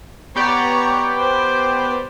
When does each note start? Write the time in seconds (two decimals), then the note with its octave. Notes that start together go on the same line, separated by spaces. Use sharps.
0.36 B3 G4 C#5 D5 A#5
1.18 C5